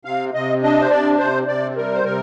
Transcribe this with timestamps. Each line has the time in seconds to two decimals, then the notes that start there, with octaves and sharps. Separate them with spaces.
0.05 C3 F5
0.34 C3 D#5
0.62 D4 D#5
0.81 C5
0.90 C3 D5
1.19 C3 C5
1.47 C3 D5
1.77 G3 A#4
1.94 C5
2.04 C3 A#4